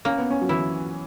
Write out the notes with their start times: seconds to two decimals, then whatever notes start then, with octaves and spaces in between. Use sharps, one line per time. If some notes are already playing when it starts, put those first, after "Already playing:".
0.05 A#3 C#4
0.18 B3
0.31 C#4
0.42 F#3
0.49 E3 E4